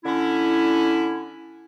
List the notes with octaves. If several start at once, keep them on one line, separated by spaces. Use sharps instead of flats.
D3 C#4 E4